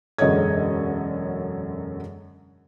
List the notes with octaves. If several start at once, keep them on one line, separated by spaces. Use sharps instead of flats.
E1 F#2 D3 C#5 D#5 G#6